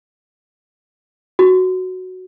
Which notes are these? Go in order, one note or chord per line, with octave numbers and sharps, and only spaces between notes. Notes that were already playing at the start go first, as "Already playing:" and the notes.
F#4